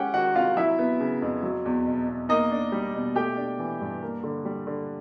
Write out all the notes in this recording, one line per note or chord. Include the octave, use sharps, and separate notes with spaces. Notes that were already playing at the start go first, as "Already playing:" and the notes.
Already playing: G#3 C#4 G4 F#5 G5
D#3 F#4 F#5
C3 F4 F5
F#3 E4 E5
B3
C#3
F2
F#3
E2
B2
E2
A#3 D#4 D#5
D4
G3
B2
A3 G4 G5
D4
E3
G2
A#3
D3
G3
D3